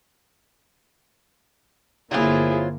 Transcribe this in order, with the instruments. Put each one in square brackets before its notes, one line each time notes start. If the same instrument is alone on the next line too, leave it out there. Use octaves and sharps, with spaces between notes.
[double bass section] G1 D3 A#3 [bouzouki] F#3 C4 F4 [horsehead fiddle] E4 G#4